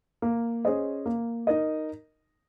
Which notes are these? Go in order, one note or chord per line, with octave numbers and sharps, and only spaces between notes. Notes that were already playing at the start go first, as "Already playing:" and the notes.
A#3
C#4 G#4 C5 D#5
A#3
D#4 A#4 D#5